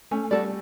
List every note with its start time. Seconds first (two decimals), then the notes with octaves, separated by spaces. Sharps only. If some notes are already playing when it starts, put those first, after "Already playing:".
0.11 A3 C#4
0.31 G3 F#4 A4 D5